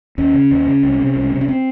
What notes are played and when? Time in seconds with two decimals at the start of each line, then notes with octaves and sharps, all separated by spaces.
0.18 D#2 C#4
0.34 C#3
0.51 D#2
0.67 C#3
0.83 C2
0.99 C3
1.16 C2
1.32 C3
1.41 C#4
1.48 C4